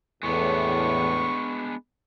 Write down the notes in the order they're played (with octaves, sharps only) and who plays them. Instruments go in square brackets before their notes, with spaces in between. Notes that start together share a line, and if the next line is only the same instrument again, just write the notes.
[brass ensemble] E2 A2 [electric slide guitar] G#3 B3 D4 [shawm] C#6